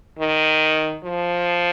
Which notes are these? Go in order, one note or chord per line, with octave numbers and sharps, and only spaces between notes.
D#3
F3